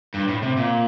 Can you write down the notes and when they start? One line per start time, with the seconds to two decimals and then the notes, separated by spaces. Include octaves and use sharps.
0.14 G2
0.28 A2
0.43 C3
0.57 A#2